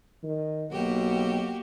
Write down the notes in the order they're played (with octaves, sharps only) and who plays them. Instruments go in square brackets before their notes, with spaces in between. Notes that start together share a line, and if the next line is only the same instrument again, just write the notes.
[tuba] D#3
[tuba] B1 [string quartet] A#3 F#4 G4